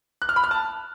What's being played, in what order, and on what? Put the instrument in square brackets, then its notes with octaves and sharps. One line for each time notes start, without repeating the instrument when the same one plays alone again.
[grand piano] F#6
F6
B5
F6
A5